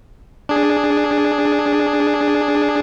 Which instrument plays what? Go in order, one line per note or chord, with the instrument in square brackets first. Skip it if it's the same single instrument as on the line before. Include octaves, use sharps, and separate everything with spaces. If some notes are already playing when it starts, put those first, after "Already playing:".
[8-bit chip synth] D4 G#4